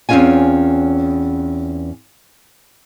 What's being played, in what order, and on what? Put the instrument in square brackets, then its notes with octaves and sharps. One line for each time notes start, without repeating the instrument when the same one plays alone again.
[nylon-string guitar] E2 C4 C#4 F4 C#5 G#5